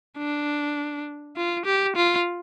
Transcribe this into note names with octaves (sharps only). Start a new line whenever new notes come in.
D4
F4
G4
F4